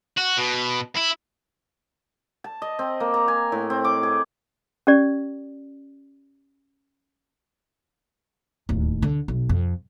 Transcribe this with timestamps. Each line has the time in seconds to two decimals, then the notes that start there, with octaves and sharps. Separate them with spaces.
0.18 F#4
0.38 B2
0.97 E4
2.44 A5
2.62 D#5
2.79 C4
3.00 A#3
3.14 A#5
3.28 G#5
3.52 A2
3.70 C4
3.84 D6
4.03 G#4
4.87 C#4 G4 D5
8.69 D1 D#2
9.02 D3
9.28 B1
9.49 F2